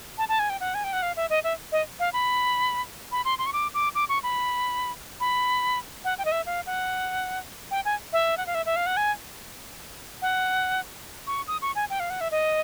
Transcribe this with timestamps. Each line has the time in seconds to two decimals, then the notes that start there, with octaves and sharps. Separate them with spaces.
0.18 A5
0.29 A5
0.39 G#5
0.50 G5
0.60 F#5
0.74 G#5
0.84 G5
0.93 F#5
1.02 F5
1.16 E5
1.30 D#5
1.44 E5
1.72 D#5
2.00 F5
2.13 B5
3.12 B5
3.25 C6
3.38 C6
3.46 C#6
3.53 D6
3.74 D6
3.95 D6
4.09 C#6
4.23 B5
5.20 B5
6.04 F#5
6.18 G5
6.25 D#5
6.32 E5
6.46 F5
6.66 F#5
7.71 G5
7.85 G#5
8.13 E5
8.37 F#5
8.46 F5
8.55 E5
8.66 E5
8.76 F5
8.86 F#5
8.97 G#5
10.22 F#5
11.27 C#6
11.47 D#6
11.62 C#6
11.75 G#5
11.90 G5
12.00 F5
12.10 F#5
12.21 E5
12.31 D#5